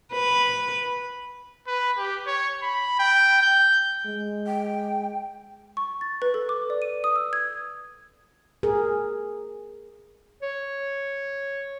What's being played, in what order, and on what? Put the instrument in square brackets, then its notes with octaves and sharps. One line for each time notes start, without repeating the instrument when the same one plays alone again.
[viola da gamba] B4
[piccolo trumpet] B4
G4
C#5
B5
G5
G6
[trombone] G#3
[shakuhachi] G5
[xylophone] C#6
A6
B4
A4
D6
D5
D#7
D#6
E6
G#6
[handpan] G#4 A#4
[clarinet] C#5